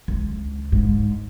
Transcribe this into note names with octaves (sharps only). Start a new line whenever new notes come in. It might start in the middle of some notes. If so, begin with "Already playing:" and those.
C#2
G#2